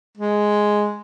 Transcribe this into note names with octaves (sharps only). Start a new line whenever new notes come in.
G#3